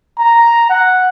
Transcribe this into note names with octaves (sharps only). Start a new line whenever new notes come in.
A#5
F#5